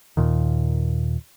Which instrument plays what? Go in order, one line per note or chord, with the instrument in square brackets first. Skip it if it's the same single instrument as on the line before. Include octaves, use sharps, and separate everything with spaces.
[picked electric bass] D#2 A#2 D#3